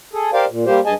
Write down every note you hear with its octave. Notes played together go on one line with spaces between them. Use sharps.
G#4 A4
G4 A#4 C5 D5 F5
A#2
G3 A#3 G4 C5
G2 G#4 D#5 G#5 A5